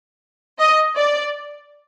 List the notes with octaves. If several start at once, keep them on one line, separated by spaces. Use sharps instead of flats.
D#5
D5